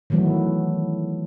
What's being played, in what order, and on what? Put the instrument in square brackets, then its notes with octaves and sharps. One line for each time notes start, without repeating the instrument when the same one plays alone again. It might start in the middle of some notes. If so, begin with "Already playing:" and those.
[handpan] D#3 E3 F#3 A3 B3